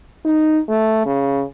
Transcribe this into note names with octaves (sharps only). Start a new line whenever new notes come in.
D#4
A3
C#3